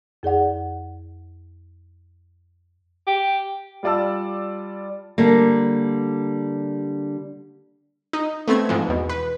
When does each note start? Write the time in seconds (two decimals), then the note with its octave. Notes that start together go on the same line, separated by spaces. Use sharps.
0.23 F2 G#4 D5 F#5
3.07 G4
3.83 G3 F4 D5 A5 E6
5.18 D3 G3 A#3
8.13 D#4
8.48 A3 B3 C4 G#6
8.69 G#2 E3 F3
8.89 E2 B2
9.09 B4